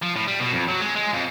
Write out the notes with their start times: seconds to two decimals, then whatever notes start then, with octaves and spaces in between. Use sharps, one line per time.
0.02 F3
0.16 A2
0.27 G3
0.40 B2
0.52 F2
0.68 F#3
0.81 G#3
0.95 G#3
1.13 F2